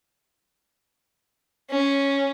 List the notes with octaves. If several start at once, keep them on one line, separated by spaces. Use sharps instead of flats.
C#4